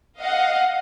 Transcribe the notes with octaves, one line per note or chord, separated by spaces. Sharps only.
D#5 F5 F#5